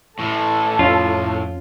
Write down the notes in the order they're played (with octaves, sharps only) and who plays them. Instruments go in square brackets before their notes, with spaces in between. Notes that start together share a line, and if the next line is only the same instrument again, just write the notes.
[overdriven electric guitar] A2 E3 [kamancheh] A4
[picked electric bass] F2 C#4 [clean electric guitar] F4